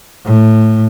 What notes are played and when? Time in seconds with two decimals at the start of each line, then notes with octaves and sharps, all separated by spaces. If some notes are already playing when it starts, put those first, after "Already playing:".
0.25 A2